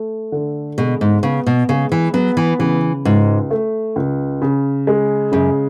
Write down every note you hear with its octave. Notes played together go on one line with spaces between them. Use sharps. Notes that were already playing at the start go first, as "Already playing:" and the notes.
Already playing: A3
D3
B2 G#3
G#2
C#3 B3
B2
C#3 G#3
E3
F#3 B3
E3
C#3 E3
C#2 G#2
A3
C#2
C#3
G#3
F#2 C#3